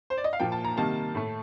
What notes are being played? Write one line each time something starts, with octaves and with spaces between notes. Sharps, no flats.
C5
D5
D#5
F5
A#2 F3 A#3 G5
A5
A#5
C3 D#3 G3 A#3 A5
A2 A3